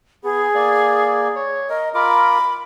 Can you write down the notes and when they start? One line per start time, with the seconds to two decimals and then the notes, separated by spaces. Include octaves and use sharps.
0.24 B3 G#4
0.54 A#3 D5
1.36 C#5
1.70 A#4 D#5
1.94 F4 A#4 B5 D6